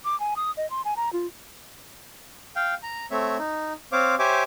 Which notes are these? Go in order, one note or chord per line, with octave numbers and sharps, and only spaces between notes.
D6
G#5
D#6
D#5
C6
G#5
A#5
F4
F5 G5
A#5
A3 C4 C#5 E5
D#4
C4 C5 C#5 F5 D6
G4 C5 C#5 E5 G#5 D6